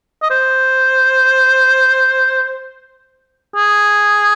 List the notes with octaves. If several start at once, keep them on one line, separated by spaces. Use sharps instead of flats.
D#5
C5
G#4